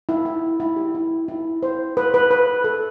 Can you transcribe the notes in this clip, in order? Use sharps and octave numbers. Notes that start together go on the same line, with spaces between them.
E4
E4
E4
G4
E4
E4
C5
B4
B4
B4
A4